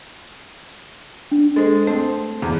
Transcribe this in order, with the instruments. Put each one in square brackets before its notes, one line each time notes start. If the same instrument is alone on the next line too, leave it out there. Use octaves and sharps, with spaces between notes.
[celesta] D4
[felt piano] G#3 [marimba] A4 C5
[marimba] A3 [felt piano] C4
[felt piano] E2